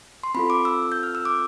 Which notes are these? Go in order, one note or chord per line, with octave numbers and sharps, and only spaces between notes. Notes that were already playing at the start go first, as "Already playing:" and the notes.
C6
C4 F4 A4 B5
D6
E6
G6
F6
E6
D6